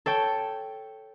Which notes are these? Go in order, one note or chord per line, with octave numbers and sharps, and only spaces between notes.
A4 C#5 G5